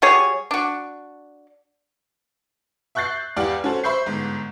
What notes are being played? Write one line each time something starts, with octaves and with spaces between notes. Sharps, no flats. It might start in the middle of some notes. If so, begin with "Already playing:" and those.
G3 F#4 G#4 C#5
D4 F#4
E5 C#6 F#6 G6 A6 C7
E2 G4 D5 F5 F#5
C#4 F#4 A4 C5
C5 E5 B5 C#6 G6 C7
G1 G#2